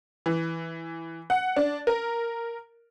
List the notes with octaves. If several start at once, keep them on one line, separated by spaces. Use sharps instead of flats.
E3
F#5
D4
A#4